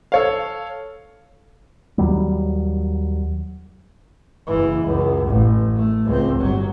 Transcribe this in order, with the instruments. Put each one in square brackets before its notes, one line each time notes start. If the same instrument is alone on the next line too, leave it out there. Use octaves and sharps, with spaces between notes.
[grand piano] A4 C#5 F5
[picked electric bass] D#2 F#3 G3
[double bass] F#1 E3
C#2 F#2
A1
A3
C#2 C4
G1 F#3